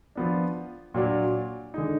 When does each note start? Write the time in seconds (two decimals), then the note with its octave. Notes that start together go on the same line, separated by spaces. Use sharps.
0.16 F3 B3 D4
0.94 A#2 F#3 D4 F#4
1.74 D3 G#3 D#4